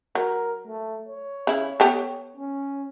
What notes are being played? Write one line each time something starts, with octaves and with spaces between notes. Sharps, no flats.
F#3 A#4
A3
C#5
C#3 E4
B3 G4 A4
C#4